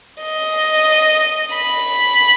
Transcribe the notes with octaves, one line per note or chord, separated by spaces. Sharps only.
D#5
B5